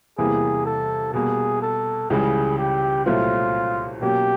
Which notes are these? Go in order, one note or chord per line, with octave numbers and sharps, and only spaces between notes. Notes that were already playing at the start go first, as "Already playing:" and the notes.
E2 C3 E3 G3 A#3 G#4
A4
B2 G3 A#3 G#4
A4
C#2 C#3 E3 G3 G#4
G4
C2 A#2 F#3 A3 C4 F4
B2 F#3 A#3 C#4 G4